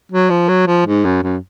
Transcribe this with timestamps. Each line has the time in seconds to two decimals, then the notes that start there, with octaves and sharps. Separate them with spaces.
0.12 F#3
0.30 F3
0.48 F#3
0.67 F3
0.86 G#2
1.04 F#2
1.23 F#2